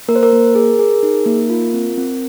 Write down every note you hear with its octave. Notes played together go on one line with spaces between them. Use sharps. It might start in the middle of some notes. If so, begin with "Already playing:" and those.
A#3 A#4
C5
A#4
A#3
G#4
G#4
D#4
A#3
F4
C4
C4